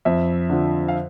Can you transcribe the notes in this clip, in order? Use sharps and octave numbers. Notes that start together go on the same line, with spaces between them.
F2 E5
D3 F3
F5